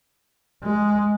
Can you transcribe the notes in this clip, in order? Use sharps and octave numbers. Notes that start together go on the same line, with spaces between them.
G#3